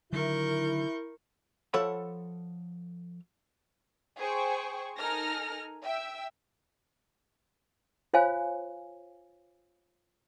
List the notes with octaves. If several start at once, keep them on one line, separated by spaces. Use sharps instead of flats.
D3 D#3 F#3 E4 A#4 C#6 G6
F3 A4 C#5 E5 F#5 B5
G#4 C5 G5 C#6
D#4 A4 A#4 G#5 F6 A#6
E5 G5 E6
F4 C5 C#5 F5 G#5